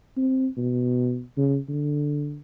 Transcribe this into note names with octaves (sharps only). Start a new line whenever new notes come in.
C4
B2
C#3
D3